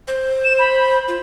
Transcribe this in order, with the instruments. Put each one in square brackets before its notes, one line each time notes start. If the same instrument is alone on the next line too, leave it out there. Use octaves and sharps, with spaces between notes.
[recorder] C5
[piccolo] E7
B5
[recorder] F4